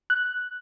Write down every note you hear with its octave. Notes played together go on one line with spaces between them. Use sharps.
F#6